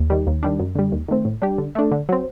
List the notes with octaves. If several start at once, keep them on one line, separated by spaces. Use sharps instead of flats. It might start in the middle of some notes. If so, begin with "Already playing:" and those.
Already playing: D#2
D#3 G3
D#2
D#3 G3 D4
F#2
D3 G3
D#2
D#3 A3 C4
A2
G3 D4 G4
D3
A3 D4
D3
F#3 C4